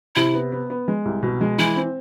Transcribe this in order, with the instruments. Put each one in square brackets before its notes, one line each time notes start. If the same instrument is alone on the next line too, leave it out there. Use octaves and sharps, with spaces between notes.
[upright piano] C3 [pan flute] E4
[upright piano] B3
B3
B3
G#3
C2
B2
G#3
[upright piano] E3 [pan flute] E4
[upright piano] C4